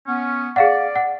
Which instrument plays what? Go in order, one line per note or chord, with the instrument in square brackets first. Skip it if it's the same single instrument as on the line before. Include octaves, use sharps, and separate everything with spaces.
[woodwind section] B3 C#4
[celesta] G#4 F5 F#5 [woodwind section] D5
[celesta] F#5